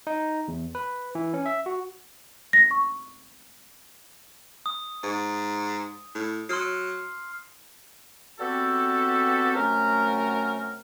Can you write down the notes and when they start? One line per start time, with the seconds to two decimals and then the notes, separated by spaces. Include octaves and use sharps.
0.07 D#4
0.48 E2
0.75 B4
1.15 E3
1.34 C#4
1.46 E5
1.66 F#4
2.53 A#6
2.71 C#6
4.66 D#6
5.03 G#2
6.15 A2
6.49 F#3 C6 F6 C7
8.40 G3 B3 C4 F#4 G4 A4
9.55 C3 F#3 A3 C#4 A#4